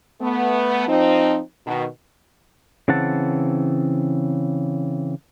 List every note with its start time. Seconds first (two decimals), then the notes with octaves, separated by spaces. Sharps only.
0.21 A3 B3
0.88 F3 C4 D#4
1.66 B2 D#3
2.88 C#3 E3 C4 F#5 A5